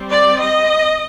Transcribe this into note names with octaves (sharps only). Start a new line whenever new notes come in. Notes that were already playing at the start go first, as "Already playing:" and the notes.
Already playing: G3 C4
D5
D#5